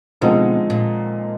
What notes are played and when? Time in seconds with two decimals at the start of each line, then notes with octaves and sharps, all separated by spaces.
0.21 B2 D3 F3 G#3 C4 D#4
0.70 A#2